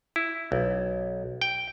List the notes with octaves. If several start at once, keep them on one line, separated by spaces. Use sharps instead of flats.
E4
B1
G5